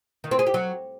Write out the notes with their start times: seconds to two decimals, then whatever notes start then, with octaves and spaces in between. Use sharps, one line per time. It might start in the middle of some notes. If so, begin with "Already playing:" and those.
0.24 D#3
0.31 C4
0.39 G#4
0.46 G4
0.54 F#3